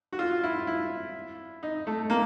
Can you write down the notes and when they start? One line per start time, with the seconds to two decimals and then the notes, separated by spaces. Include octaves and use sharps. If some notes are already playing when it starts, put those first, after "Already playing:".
0.13 F#4
0.19 F4
0.43 E4
0.67 E4
1.63 D#4
1.87 A3
2.10 A#3